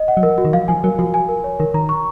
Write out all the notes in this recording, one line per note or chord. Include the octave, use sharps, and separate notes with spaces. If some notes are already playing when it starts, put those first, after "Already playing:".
Already playing: D#5
F#5
F#3
F3 A#4
F#4
D#3
F3 F5
F3 G#5
F#3 A#4
F3 F#4
G#5
A#4
C#5
D#3 A#4
D#3 A#5
C#6